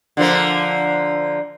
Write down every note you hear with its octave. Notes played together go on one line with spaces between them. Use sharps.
D3 F3 A#3